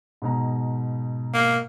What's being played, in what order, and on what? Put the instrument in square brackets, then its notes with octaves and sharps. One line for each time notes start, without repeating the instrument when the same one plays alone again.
[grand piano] G#2 B2 A#5
[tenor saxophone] A#3